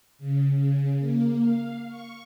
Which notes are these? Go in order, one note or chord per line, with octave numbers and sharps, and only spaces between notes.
C#3
C#3
A#3
F5
C#6